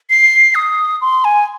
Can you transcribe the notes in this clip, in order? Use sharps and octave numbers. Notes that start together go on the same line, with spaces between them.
C7
D#6
C6
G#5